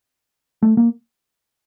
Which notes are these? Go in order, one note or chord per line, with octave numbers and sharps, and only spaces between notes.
A3
A#3